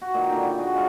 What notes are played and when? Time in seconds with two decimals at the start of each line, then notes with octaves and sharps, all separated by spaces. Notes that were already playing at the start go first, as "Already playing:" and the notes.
0.01 F#4
0.14 A#2 D#3
0.29 D3 A#3 G5
0.43 B5
0.58 F#4 G#4
0.75 G#3 C#4 E4 F4